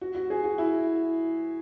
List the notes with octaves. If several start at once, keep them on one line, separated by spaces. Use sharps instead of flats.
F#4
F#4
G#4
F#4
E4